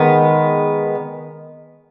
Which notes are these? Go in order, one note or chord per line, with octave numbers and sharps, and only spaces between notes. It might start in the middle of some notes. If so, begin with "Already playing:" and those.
Already playing: D#3 G#3 B3